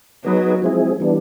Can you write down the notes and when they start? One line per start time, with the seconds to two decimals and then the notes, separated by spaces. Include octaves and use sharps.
0.24 F#3 B3 D#4 G#4 B4
0.62 F3 G#3 C4 E4 G#4
1.00 E3 G3 B3 D4